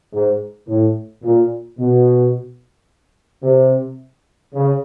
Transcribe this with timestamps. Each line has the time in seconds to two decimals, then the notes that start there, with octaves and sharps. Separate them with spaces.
0.13 G#2
0.68 A2
1.24 A#2
1.79 B2
3.43 C3
4.54 C#3